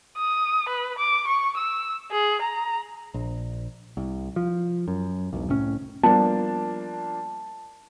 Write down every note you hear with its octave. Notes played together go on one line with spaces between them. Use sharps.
D#6
B4
D6
C#6
E6
G#4
A#5
A#1
C2
F3
F#2
E1 B1
C2 A2 C#4
F3 G3 A#3 B3 D4 A5